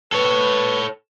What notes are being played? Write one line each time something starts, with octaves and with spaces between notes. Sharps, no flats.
A4 B4 C#5